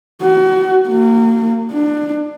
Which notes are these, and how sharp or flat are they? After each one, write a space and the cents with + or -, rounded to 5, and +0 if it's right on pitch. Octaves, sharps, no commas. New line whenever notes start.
F#4 +35
A#3 -30
D4 +20